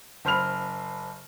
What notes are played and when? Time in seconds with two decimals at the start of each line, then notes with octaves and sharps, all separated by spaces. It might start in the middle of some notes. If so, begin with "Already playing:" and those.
0.25 F#1 C5 B5 F6 F7